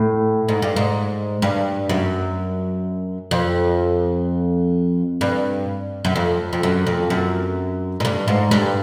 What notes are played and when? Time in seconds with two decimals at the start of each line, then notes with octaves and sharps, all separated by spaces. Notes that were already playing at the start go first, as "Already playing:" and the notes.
Already playing: A2
0.49 G#2
0.62 G2
0.76 G#2
1.42 G2
1.89 F#2
3.31 F2
5.21 G2
6.05 F#2
6.16 F2
6.53 F2
6.63 F#2
6.87 F2
7.10 F#2
8.00 G#2
8.05 G2
8.28 G#2
8.51 G2